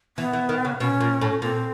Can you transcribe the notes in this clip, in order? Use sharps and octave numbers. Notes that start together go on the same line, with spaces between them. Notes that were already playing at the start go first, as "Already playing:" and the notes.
E3 B3
E3
D#3
C#3
B2 C#4
A#2
A2
A#2 C4